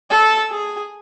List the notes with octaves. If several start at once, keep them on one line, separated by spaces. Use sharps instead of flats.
A4
G#4